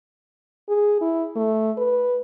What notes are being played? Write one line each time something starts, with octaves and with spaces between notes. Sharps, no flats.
G#4
E4
A3
B4